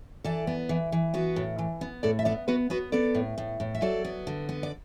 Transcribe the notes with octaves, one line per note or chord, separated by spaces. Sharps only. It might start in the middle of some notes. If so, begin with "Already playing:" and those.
E3 A4 D5
B3
E3
E3
B3 F#4 B4
A2
E3
B3
A2 A4 D5
E5
B3 A4 D5
B3 F#4 B4
B3 F#4 B4
B3 A4 D5
A2
A2
A2
E5
F#3 A4 D5
B3
D3
B3
D5